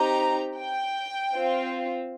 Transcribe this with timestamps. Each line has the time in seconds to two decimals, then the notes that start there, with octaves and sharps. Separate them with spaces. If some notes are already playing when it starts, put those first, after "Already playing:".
Already playing: C4 D#4 G4 A#5
0.57 G5
1.34 C4 F4